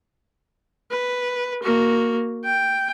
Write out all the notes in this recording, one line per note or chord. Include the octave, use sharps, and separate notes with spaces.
B4
A#3 F#4
G5